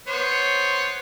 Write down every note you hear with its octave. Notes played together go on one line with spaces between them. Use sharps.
B3 C5 C#5